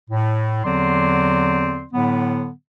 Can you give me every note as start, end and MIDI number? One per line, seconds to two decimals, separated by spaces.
0.10 0.62 45
0.64 1.84 40
0.64 1.84 50
0.64 1.84 54
0.64 1.84 60
0.64 1.84 74
0.64 1.84 84
1.93 2.50 45
1.93 2.50 50
1.93 2.50 54
1.93 2.50 59